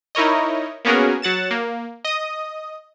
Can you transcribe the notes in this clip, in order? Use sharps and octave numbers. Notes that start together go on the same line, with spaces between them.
D#4 E4 A#4 C#5 D#5
A#3 B3 C#4 F#4 G#4 A#4
F#3 F#5 A6 E7
A#3
D#5 D#6